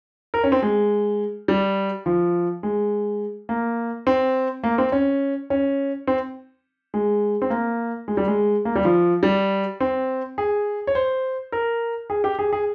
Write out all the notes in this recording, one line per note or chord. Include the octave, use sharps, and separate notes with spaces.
A#4
C#4
C4
G#3
G3
F3
G#3
A#3
C4
A#3
C4
C#4
C#4
C4
G#3
C4
A#3
G#3
G3
G#3
A#3
G3
F3
G3
C4
G#4
C#5
C5
A#4
G#4
G4
G#4
G#4